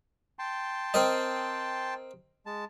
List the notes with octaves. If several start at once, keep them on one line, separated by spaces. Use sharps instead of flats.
G5 A5 C6
C4 A#4 D#5
G#3 A5